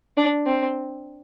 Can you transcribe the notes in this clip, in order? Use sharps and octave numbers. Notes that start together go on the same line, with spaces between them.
D4
C4